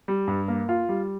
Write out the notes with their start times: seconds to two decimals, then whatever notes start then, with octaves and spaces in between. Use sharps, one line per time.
0.08 G3
0.28 G2
0.48 A#3
0.69 F4
0.89 G3